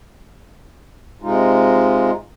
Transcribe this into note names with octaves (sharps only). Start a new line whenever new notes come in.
C3 G#3 D#4 F4